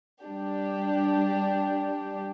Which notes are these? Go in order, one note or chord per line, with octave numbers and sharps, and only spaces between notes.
G3 D4 G4